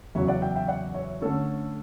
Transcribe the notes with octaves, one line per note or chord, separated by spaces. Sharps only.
E2 C#3 F#3 C#5 E5
D5 F#5
E5 G5
E5 G5
D5 F#5
C#5 E5
D3 A3 C#4 A4 C#5